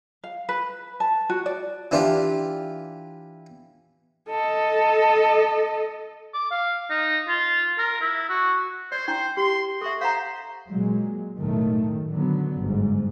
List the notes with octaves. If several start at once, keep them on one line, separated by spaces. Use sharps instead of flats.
F5
B4
A5
F#4
D5
E3 D4 F4 G4
A4 D#5
D6
F5
D#4
F4
A#4
E4
F#4
C5 D5
E4 C5 G5
G4 C6
F#4 A4 E5
C5 F5 F#5 A#5
A#2 F#3 G#3
B1 F#2 A2 D#3 A3
D3 F#3 B3
G1 G#2